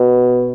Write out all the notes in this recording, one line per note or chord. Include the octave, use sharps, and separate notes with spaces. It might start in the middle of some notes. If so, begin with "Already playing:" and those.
Already playing: B2